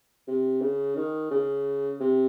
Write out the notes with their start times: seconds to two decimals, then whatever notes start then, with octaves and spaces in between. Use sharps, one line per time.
0.28 C3
0.62 C#3
0.96 D#3
1.31 C#3
2.00 C3